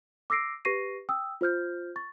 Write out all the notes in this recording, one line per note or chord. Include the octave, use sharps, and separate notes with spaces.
D6 E6 A#6 C7 D7
G4 B4 C#6 A#6 C7 D#7
G5 D#6 E6
F4 C5 F6 G6
C#6 A6